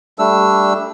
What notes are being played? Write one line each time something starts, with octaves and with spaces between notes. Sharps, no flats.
G3 A3 D4 E6